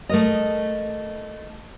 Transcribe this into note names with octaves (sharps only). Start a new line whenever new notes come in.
A3 A#4 D#5